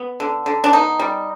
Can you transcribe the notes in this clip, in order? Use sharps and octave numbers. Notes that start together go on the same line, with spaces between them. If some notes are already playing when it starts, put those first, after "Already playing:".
Already playing: B3
D3
D3
D4
B3 D#4
G3